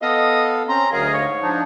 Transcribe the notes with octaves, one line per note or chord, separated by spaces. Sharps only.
B3 A4 D#5 F5
C4 C#4 A#5 C6
D2 F#3 G#4 A#4 D#5 F5
G#2 C#5
F3 D4 D#4